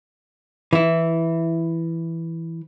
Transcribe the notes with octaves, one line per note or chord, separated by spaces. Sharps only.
E3 E4